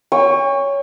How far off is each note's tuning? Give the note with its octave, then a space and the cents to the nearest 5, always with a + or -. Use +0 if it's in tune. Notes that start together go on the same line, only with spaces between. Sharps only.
C#5 +10 G5 +45 C#6 +0